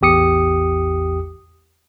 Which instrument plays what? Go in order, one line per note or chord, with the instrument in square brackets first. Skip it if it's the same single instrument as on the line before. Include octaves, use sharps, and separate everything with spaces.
[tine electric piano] A1 E2 G4 D#6 C#7